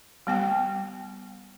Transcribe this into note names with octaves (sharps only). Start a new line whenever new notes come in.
G3 B3 G5